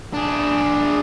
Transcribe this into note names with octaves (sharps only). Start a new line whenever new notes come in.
D4 G#4